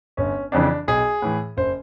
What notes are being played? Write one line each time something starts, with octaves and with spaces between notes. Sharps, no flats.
G1 C#4
F2 C#3 E3 D4
B1 G#4
A2 E3
F#1 C5